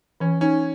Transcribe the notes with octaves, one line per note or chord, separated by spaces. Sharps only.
E3 C#4
C#4 D#4